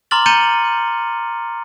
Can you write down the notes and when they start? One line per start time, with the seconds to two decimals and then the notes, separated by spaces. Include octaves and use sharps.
0.11 A#5 C6 D6 F6 A6 F#7
0.26 A#5 G6 A6 C#7 D#7 G7